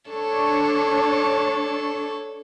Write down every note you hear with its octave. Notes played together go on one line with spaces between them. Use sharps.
D4 A4 C#5